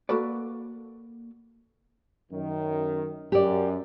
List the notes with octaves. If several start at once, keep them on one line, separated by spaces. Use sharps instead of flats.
A#3 F#4 A4 B4 D5
F#2 D#3
F#2 G4 D5